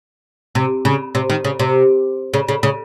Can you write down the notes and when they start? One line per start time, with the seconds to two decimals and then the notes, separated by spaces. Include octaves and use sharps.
0.55 C3
0.85 C#3
1.15 C3
1.30 D#3
1.45 C#3
1.59 C3
2.34 C#3
2.48 C#3
2.63 C#3